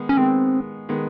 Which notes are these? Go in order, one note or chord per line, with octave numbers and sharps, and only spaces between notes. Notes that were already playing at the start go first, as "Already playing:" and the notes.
Already playing: D#3 G#3 B3
C#4
D#3 G#3 B3 C4
D#3 G#3 B3